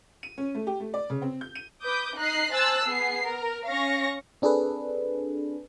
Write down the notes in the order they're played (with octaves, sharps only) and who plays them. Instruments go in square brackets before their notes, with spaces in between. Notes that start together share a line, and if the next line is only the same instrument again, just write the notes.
[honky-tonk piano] D#7
C#4
A3
G4
A3
D5
C#3
C4
G6
D#7
[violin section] B4 D6 D#6 G6
D#4 D#5 F#6 C7
C5 G#5 A5 E6 F#6 A6
B3 G#4 C7
A#4
C#4 F5 C#6 A#6
[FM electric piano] C4 D4 G#4 A4 B4